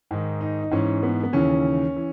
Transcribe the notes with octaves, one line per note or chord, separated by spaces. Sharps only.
G#2 D#3
D#4
D#4
G#2 E3 C#4
B3
B3
D#2 C#3 E3 C#4
E3